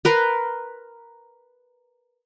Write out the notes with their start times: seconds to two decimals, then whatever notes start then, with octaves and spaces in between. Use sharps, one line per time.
0.05 A#4 B4 C6